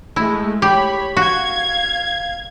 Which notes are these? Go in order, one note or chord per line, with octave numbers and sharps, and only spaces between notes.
G#3 A3 E4
G4 C#5 B5
F#4 F5 G#6